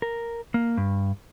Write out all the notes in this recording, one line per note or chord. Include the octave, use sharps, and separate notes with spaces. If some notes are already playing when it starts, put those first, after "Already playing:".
A#4
A#3
G2